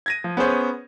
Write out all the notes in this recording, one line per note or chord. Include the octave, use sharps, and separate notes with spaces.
G#6 A#6 D#7
F3
B3 C#4 G#4 C5 C#5